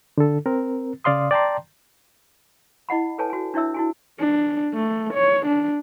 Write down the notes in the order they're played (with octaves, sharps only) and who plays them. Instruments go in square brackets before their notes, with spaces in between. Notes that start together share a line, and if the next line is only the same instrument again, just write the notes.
[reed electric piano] D3 A4
C4 A#4
C#3 D5 F5 C6 D#6
D5 G5 A5 A#5 C6
[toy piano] E4 D#5 F#5 B5
A4 B4 C#5 G#5 A5
F#4 G#5
D4 E4 C#5 E5 E6
E4 F#4 G#5
[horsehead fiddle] D4
A3
C#5
D4